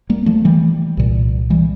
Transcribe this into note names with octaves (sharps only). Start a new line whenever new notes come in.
G3 A#3
F3 A3
E3 G3
C2 A#2
E3 G3